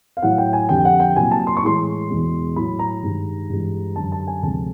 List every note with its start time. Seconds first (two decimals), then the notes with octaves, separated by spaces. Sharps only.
0.17 F5
0.22 A2 F#3 F#5
0.38 G5
0.53 G#5
0.69 F2 D3 G3 G5
0.85 F#5
1.00 G5
1.16 C2 A#2 F#3 G#5
1.31 A5
1.47 C6
1.57 C#6
1.63 A2 E3 G#3 C6
2.10 E2 B2 G#3
2.56 A2 F#3 B5
2.79 A#5
3.03 G2 D#3 G#3
3.49 G2 E3 G#3
3.96 F#2 D3 G3 A5
4.12 A5
4.27 G#5
4.43 D2 C3 F3 G#3 A5